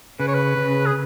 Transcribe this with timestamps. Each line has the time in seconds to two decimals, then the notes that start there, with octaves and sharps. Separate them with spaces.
0.20 C#3 B4
0.28 C#5
0.34 B4
0.57 C#3
0.86 G#4